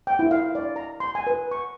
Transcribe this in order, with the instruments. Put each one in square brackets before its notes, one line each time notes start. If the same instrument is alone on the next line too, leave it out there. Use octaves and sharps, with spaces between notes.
[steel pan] G5
E4
F5
D5
A#5
C6
G#5
B4
C#6